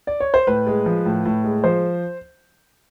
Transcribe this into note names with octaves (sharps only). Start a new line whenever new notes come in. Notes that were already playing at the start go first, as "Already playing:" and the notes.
D5
C#5
C5
A2 B4
G#3
F3
A2
A2
G#3
F3 C5